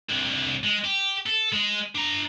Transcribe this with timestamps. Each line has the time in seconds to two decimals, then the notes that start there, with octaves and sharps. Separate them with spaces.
0.10 C2 D3
0.63 G#3
0.84 G4
1.26 A4
1.52 G#3
1.95 D4 A#5